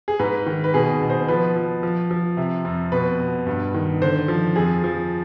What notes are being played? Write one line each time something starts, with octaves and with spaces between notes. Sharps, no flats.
G#4
G#2 B4
D#3
B4
B2 G#4
B2
C5
F3 B4
F3
F3
F3
C3
F2
B2 B4
B2
G2
D#3
D3 C5
F3
F2 G#4
F3